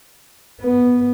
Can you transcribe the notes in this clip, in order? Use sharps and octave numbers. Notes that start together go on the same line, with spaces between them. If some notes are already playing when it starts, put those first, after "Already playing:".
B3